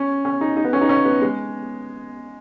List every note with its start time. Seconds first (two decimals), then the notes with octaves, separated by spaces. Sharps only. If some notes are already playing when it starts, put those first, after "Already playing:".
Already playing: C#4
0.25 C#4
0.41 D#4
0.56 D#4
0.65 B3
0.73 C#4
0.81 D#4
0.89 C#4
1.05 B3
1.21 G#3